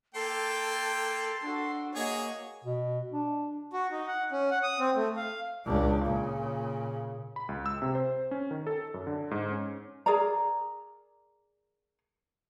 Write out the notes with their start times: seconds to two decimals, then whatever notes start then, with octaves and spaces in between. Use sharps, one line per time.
0.14 A#3 A4 G5 A5 C6
1.42 D4 F#4 A4
1.95 A#3 F#4 G#4 C#5 D#5
2.65 B2
3.12 D4
3.73 F#4
3.92 D#4
4.07 F#5
4.32 C#4
4.51 F#5
4.63 D#6
4.80 C4
4.95 A3
5.16 F5
5.66 C#2 D4
6.04 A#2 C#3
7.36 B5
7.49 C#2
7.66 E6
7.82 C3
7.95 C5
8.31 C#4
8.51 D#3
8.67 A4
8.94 F#2
9.07 D3
9.31 G#2
9.52 C#4
10.06 G#4 A#4 D5 A#5